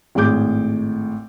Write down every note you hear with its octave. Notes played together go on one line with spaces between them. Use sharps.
G#1 A2 G#4 D6 G6